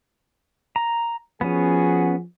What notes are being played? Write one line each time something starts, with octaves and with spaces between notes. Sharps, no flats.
A#5
F3 B3 C#4 F#4 G#4